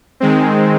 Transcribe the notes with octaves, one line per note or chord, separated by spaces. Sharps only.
D#3 G#3 C4